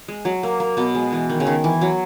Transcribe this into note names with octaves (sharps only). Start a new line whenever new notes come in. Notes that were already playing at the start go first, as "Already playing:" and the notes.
G#3
F#3
A#3
A#3
B2 B3
G#3
E3
D#3
C#3
D#3
E3
F#3